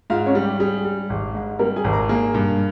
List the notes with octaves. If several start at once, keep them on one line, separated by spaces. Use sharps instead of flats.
G#2 F4 F5
C#4 C#5
G3
G4
G3 G#4
G3
G#1
G#2
G3 A#3 A#4
G#4 G#5
G#1
A#4 A#5
A#3 G#4 G#5
G2